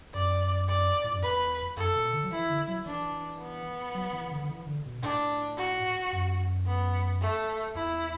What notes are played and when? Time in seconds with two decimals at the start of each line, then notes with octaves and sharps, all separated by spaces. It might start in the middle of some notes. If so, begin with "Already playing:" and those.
0.14 F#2 D5
0.68 D5
1.04 A2
1.14 F#2
1.23 E2 B4
1.77 F#2 A4
1.96 B2
2.13 D3
2.24 F#3
2.31 E3 E4
2.49 D3
2.68 F#3
2.86 E3 D4
3.41 B3
3.95 F#3
4.13 E3
4.31 D3
4.42 D3
4.49 E3
4.67 D3
4.86 B2
5.03 A2 D4
5.58 F#4
6.13 F#2
6.67 B3
7.21 A3
7.75 E2 E4